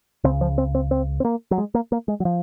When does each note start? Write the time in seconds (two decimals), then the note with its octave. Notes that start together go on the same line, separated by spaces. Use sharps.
0.24 C#2 C#3 C4
0.41 F3
0.58 C4
0.75 C4
0.91 C4
1.20 C4
1.25 A#3
1.51 F#3
1.58 G#3
1.74 A#3
1.92 A#3
2.08 G#3
2.20 F#3
2.25 F3